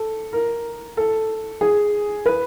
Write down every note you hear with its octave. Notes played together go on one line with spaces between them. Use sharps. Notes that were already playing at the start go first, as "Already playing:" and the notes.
Already playing: A4
A#4
A4
G#4
B4